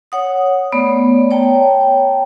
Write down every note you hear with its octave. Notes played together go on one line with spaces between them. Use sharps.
C#5 F#5 D#6
A3 B3 C#5 D5
C#5 G5 A5 A#5